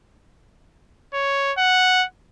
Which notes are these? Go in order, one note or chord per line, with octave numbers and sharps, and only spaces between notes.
C#5
F#5